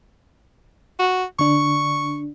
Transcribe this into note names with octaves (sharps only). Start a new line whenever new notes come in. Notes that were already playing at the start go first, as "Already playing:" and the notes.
F#4
D3 D4 C#6